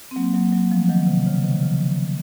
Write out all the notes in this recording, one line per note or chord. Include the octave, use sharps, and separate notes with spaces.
C4
F#3 A#3
F#3 A#3
F#3 A#3
F3 A3
D#3 F#3
C3
C#3
C3 D#3
C#3 F3